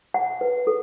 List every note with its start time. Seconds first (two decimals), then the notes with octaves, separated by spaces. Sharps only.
0.14 F#5
0.41 B4
0.67 A4